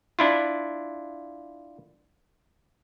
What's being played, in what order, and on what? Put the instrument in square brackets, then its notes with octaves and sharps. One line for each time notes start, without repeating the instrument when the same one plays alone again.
[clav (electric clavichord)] D4 E4 F4